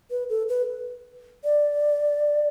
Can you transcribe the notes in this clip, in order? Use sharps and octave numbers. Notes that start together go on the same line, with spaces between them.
B4
A4
B4
D5